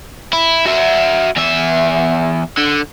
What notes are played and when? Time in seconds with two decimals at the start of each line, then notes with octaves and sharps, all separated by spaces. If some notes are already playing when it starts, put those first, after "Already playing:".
0.33 E4
0.66 F#4 E5
1.36 E2 E5
2.57 D3